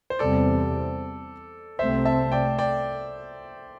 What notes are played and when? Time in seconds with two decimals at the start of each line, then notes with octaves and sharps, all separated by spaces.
0.10 C5
0.19 E2 C3 G3 C4 A4 D5
1.79 C2 C3 A3 C4 C5 E5
2.05 E5 A5
2.32 D5 G5
2.58 D5 G5